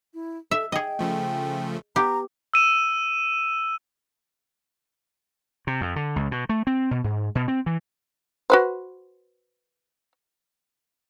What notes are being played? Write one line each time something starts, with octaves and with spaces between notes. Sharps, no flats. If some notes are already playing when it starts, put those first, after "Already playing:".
E4
A4 E5
G#4 D#5 G5
C#3 F3 A3
B3 G4 A#5
E6 D#7 E7
C3
F2
D3
C#2
B2
A3
C4
B2
G#2
B2
C4
E3
F#4 B4 C5